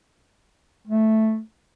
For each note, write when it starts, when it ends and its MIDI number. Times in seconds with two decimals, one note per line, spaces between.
0.87 1.40 57